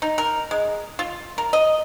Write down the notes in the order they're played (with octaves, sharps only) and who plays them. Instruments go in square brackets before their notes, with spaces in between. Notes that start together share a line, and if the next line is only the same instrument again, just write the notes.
[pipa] D#4
A#4
G#3
F4
A#4
D#5